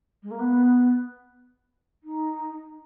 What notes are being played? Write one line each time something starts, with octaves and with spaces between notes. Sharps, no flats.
G#3
A#3
B3
D#4